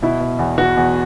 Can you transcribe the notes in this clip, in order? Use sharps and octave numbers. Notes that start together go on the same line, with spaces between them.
B2 E4
B2
E2
B2 F#4
E2